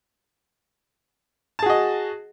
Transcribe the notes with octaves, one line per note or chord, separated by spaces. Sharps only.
F#4 G#4 D#5 A5